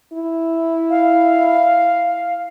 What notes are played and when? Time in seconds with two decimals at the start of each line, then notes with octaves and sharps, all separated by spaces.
0.13 E4
0.90 F5